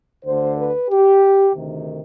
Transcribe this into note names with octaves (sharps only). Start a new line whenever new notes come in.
D2 D3 C5
B4
G4
D2 C3 D#3